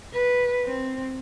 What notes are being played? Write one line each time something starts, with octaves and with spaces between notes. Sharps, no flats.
B4
C4